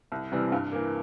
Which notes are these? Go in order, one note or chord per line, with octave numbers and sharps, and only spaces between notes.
C2
C3 E3 G3 C4
G2
E3 A#3